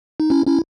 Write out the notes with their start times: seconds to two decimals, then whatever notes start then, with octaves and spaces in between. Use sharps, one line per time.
0.20 D#4
0.30 C#4 E4
0.47 C#4 E4